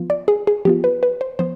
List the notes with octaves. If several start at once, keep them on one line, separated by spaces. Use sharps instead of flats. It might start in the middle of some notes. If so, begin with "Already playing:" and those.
Already playing: F3 B3 F4
D5
G#4
G#4
F3 B3 F4 G4
B4
B4
C5
F3 B3 C5